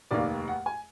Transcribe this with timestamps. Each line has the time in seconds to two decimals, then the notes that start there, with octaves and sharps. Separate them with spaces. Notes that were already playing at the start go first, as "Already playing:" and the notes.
0.11 F1 D#2 D#3 A#3 D5
0.48 F#5
0.66 G#5